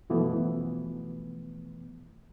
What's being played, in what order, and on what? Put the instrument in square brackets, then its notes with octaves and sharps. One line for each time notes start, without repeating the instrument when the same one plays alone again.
[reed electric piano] F#2 B2 E3 F3 A3 B3